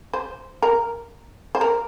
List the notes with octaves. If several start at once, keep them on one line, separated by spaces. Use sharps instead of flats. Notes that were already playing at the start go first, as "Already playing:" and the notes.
C5
A#4
C5
A#4